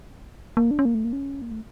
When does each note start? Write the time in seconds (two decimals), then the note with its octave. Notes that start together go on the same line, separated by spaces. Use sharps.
0.57 A#3
0.71 D4
0.79 C#4
0.85 A#3
0.95 A3
1.05 A#3
1.13 C#4
1.42 A#3
1.51 A3